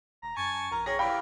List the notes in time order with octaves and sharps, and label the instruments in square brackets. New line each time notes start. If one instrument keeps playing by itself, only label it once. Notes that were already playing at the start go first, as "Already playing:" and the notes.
[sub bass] E1 [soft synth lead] A#5
[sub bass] F#2 [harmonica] G#5 A5 [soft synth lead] C#6
[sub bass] A#1 [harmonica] A#4 [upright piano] A#5
[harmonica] G#4 G5 [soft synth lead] C#5 [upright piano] A#6
[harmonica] E3 G4 D5 [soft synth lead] F5 [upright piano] G5 B5